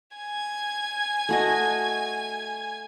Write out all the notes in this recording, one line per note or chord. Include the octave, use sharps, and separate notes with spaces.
G#5 G#6
A3 F#4 D#5